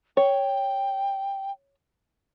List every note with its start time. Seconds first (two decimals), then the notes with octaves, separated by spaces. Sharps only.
0.17 C#5 G5